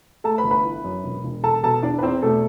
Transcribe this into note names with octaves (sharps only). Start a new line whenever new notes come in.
A3 A4 A5
B4 B5
G1
B4 B5
E3
F#2
E1
E1
E1 A4 A5
B2 A4 A5
E2 D4 D5
B4
E2 C4 C5
B2 A3 A4